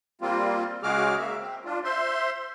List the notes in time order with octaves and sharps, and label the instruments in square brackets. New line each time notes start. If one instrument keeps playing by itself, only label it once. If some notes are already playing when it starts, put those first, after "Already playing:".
[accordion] G3 A#3 C4 F4
C#3 G#3 F#4 G#4 D6 F6
A#3 E5
C4
D4 F4
C5 E5 C6